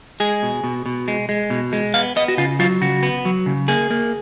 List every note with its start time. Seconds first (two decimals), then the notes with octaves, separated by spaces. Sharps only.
0.20 G#3 G#4
0.43 B2
0.64 B2
0.86 B2
1.08 G#3
1.29 G#3
1.50 B2
1.73 G#3
1.94 B3 F5
2.16 B3 D#5
2.28 F#4
2.38 C#3 F4
2.59 F#3 F4
2.81 C#3 F#4
3.03 B3
3.25 F#3
3.46 C#3
3.68 A#3 G#4
3.90 A#3